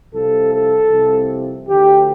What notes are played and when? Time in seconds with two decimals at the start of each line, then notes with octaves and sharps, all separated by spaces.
0.14 C2 C3 F3 A4
0.53 A4
0.91 C2 C3 F3
1.67 D2 D3 F3 G4